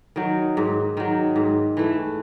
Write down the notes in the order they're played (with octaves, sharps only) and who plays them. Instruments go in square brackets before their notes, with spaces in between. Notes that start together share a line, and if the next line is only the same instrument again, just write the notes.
[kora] D#3 F#3
G#2
D#3 F#3
G#2
E3 A3